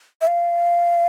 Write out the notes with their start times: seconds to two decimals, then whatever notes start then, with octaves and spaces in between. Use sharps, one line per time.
0.21 E5
0.27 F5